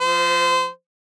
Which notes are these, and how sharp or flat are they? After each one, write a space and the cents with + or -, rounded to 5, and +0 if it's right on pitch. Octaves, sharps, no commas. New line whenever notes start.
F3 +0 C5 -25